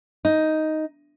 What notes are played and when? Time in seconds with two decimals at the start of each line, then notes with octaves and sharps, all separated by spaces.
0.25 D#4